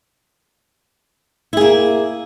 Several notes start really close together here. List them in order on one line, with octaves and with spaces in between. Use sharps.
E4 G#4 A#3